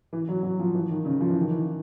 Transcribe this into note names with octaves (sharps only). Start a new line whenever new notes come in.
E3
F#3
F#3
F3
E3
D#3
C#3
F3
E3
D#3
E3